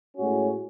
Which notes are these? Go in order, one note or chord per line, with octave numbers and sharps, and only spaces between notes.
A2 G#3 C#4 F#4